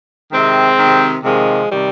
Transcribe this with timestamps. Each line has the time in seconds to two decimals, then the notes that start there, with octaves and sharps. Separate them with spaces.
0.32 C3 D#3 G#3 C4
0.79 C3 D#3
1.24 C3 D#3 F3 G#3
1.70 C3 D#3 G3